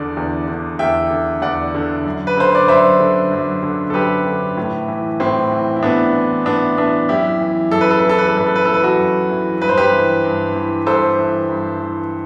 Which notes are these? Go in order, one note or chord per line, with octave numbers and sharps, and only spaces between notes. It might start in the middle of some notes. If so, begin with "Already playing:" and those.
Already playing: E2 D3 D5
E2
D3
E2 E5 G5
D3
E2 D5 F#5
D3
F#2
B4
D3 C5
D5
F#2 C5 E5
D3
F#2
D3
A4
F#2 G4 B4
D3
A2
E3
A2 C4
E3
E4
A2 B3 D4
E3
A2 B3 D4
E3 B3 D4
F#2 E4 G4
E3
F#2 A4
B4
A4
B4
E3
A4
B4
A4
F#2 B4
A4
B4
E3 A4
B4
F#4 A4
F#2
E3
G2 B4
C5
G4 B4
E3
G2
E3
G2 A4 C5
E3
G2
E3